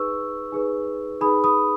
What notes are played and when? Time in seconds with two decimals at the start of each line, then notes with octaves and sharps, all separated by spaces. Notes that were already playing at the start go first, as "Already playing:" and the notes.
Already playing: D#4 G#4 B4 C#6 E6
0.52 D#4 G#4 B4
1.21 D#4 G#4 B4 B5 D#6
1.44 B5 D#6